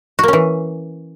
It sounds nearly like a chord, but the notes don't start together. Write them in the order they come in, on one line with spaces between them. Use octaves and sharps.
F#4 A#3 C#4 E3